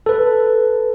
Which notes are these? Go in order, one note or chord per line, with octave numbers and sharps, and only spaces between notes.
A4 B4